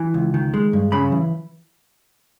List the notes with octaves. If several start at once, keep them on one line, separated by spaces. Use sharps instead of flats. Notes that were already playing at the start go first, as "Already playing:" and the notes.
Already playing: E3
C#2
D#3
G#3
G2
C#3 B5
E3